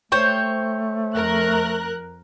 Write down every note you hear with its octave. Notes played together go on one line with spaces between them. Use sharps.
A3 C5 C#5 G5
F2 A#4 F#6